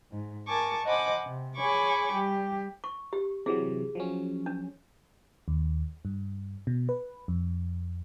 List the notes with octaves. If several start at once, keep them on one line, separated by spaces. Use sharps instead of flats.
G#2
A#4 G#5 A5 C#6 D6
C5 D#5 F#5 G#5 B5 D6
C3
G#4 C#5 G#5 B5 C#6 D6
G3 G4
C#6
G4
C3 E3 F#3 G#4
F3 F#3 C#4
D4
D#2
G2
B2
B4
F2